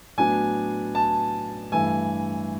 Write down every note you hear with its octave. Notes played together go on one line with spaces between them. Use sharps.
A2 F#3 B3 D4 G#5
A5
G2 E3 A3 G#5